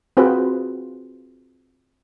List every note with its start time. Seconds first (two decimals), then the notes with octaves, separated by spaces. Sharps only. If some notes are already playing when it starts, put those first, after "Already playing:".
0.17 C4 F4 F#4 G#4 B4 C5